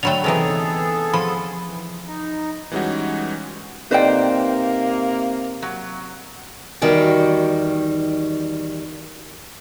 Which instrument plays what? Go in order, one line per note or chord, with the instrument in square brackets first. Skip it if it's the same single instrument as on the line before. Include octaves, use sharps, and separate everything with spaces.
[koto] D3 F#3 A3 [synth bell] G5 B5 F7
[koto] C3 E3 D#4 [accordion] B3 G#4 A4
[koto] F3 [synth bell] B5
[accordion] E3
D#4
[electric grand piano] E3 G3 G#3 C#4 D#4 F#4
[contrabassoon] C3 [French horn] A#3 [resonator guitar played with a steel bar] D#4 C5 [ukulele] B4 D5 G5
[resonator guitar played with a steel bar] F#3
[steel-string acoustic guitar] E2 D#3 G3 F#4 G5